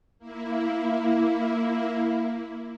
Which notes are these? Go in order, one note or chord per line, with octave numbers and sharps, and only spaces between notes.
A#3 E4